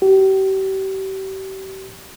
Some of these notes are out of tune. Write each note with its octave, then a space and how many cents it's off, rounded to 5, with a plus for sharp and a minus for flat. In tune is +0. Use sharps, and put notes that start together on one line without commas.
G4 -35